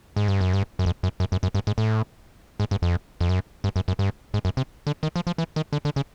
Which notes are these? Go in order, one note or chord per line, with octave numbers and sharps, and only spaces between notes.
G#2
G2
F#2
G2
F#2
F2
F#2
F#2
F#2
F#2
G2
G#2
A2
G#2
G2
F2
F2
F#2
G2
F#2
F#2
G2
G#2
F#2
C3
D3
D#3
F3
F3
E3
D#3
D3
D3
C#3